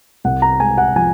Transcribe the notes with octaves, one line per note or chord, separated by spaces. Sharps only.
C2 F#5
A#5
G#3 G#5
F#5
F3 G#5